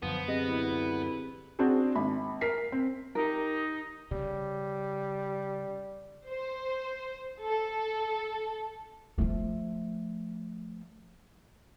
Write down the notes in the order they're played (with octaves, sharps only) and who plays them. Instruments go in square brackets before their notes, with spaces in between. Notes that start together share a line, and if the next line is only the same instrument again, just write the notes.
[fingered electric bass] F#2 D3 [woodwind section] F3 [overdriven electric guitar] B3
[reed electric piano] C4 G4 G#4 [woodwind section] D#5
[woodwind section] D2 E4
[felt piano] C4 D4 F#4 G#4
G#1 B5
A#4 B6 C7
C4
[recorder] D#4 [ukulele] G4 A#4
[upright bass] C#3 [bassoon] G3
[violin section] C5
A4
[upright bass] F3 A3